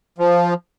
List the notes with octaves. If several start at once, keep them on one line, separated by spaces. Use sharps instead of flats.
F3